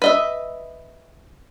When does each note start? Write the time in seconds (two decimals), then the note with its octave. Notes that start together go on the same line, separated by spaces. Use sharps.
0.02 B4 D#5 E5